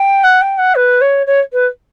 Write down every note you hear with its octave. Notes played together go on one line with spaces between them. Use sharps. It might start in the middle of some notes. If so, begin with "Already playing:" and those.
Already playing: G5
F#5
G5
F#5
B4
C#5
C#5
B4